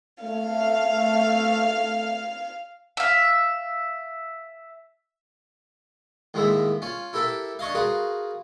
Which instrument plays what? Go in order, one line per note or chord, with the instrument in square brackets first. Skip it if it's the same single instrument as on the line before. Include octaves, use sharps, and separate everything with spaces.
[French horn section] A3 [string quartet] F5
[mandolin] E5 F5
[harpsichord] D#2 A2 G#3 A#3 E5
C#4 F4
E4 G4 A4 A#4 E5 G5
D4 C#5 D#5 F5
F4 F#4 G#4 A#4 B4